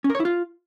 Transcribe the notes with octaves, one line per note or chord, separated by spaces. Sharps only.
C#4
A#4
C#5
E4
F4